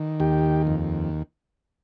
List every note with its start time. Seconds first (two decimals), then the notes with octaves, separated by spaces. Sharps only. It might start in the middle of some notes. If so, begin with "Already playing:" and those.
Already playing: D#3
0.20 D#2 G4
0.67 F2